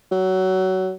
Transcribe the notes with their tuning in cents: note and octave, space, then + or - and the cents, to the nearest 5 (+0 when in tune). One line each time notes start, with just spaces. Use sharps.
F#3 +20